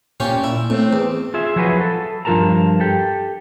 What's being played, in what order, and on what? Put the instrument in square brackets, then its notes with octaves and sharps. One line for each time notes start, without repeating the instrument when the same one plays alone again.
[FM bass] A#2 [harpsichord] C#4 F4 G4
[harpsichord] E4
[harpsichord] A2 [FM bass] C4
[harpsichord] E2
[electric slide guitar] F4 G#4 E5
F3 F#3 F#4 G#4 B4
A4
G2 F3 F4 A#4 A5 A#5
G4 A4